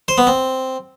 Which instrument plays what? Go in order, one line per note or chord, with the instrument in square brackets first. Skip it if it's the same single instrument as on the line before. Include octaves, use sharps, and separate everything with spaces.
[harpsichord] C5
B3
C4